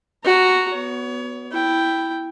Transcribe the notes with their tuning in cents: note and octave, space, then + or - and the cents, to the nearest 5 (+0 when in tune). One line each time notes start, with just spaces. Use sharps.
F#4 +0 A#5 -10
B3 +0 C#5 +30
E4 +0 G5 +0